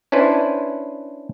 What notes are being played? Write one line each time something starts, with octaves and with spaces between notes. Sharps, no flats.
C#4 D4 E4 B4 C5